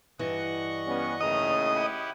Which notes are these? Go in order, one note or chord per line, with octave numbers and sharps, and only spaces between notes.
G2 E3 D4 D#5 F#5 C#6
G3 B3 C#4
D#2 A2 C#3 D#5 A#5
E4 G4 F#5